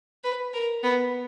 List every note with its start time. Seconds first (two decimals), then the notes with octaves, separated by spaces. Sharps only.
0.24 B4
0.53 A#4
0.83 B3